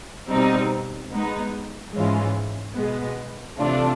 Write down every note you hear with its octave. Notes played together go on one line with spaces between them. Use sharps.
B2 G3 C4 D#4
G#3 B3 D#4
G#2 E3 G#3 C#4 F4
B2 G#3 B3
C3 E3 A3 D4 F4